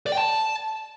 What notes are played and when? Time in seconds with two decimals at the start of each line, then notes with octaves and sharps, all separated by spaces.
0.06 D5
0.12 G5
0.18 A5